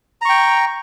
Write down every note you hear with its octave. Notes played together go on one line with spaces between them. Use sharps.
G5 A#5 C#6